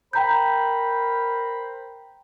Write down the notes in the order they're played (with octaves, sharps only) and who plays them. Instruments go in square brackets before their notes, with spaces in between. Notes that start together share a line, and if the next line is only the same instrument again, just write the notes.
[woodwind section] A#4 C5 B5 [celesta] G5 A#5 G6